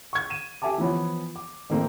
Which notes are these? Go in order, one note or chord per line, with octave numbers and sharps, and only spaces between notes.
C#6 G#6
D#7 E7
G4 A4 E5 G#5 A5 D6
E3 F3 B3 C#5
D6
A1 D#3 A#3 C4 A4